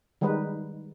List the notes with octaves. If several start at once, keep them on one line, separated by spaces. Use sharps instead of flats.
D#3 G3 G#3 D#4 B4